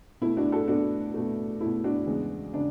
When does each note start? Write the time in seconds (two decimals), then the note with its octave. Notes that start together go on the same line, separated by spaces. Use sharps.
0.21 B2 A3 E4
0.37 D4 F#4
0.52 F#4 A4
0.68 B2 A3 D4 F#4
1.14 B2 A3
1.61 B2 A3 E4
1.84 D4 F#4
2.07 E2 C#3 G#3
2.54 C#3 D4